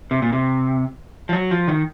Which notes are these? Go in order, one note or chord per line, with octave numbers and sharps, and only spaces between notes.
C3
A#2
C3
F3
F#3
F3
D#3